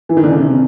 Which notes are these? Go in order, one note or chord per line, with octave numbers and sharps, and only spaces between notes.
E3
D#3
D3
C#3
C3